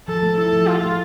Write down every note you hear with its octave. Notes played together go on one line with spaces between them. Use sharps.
F3 A4
A3
E4 A4
F3
F3 F4
A3